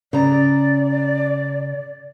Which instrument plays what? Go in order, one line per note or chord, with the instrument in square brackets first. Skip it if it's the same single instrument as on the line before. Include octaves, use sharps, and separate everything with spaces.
[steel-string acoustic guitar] C#3 A#5 [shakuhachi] D5